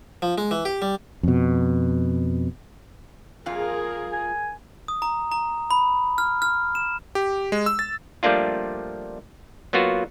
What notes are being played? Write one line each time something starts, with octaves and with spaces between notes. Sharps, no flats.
F3
G#3
E3
G4
G3
F2 B2
F2 A#2 F4 G#4 A#4
G#5
D#6
A#5
A#5
B5
F6
F6
E7
G4
G#3
E6
A6
F3 G3 A3 A#3 D4 F4
F#3 A#3 B3 F4 F#4